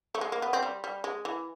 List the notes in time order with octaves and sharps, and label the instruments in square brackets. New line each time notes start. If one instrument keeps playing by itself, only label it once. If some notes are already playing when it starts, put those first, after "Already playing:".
[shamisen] A3
G#3
A#3
B3
C4
G3
G3
G#3
E3